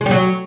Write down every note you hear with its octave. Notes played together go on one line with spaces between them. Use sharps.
G#3
G3
F#3